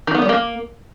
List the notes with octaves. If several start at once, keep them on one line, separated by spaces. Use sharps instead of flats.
D#3
B3
G3
A#3